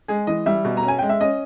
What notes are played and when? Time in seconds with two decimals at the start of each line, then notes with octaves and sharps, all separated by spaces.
0.08 G#3 G#4
0.27 E3 D#5
0.46 G3 E5
0.65 B2
0.77 A#5
0.83 C#4
0.88 G#5
0.99 G#3 G5
1.09 E5
1.21 C#4 D#5